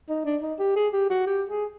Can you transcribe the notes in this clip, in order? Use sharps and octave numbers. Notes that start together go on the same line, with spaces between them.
D#4
D4
D#4
G4
G#4
G4
F#4
G4
G#4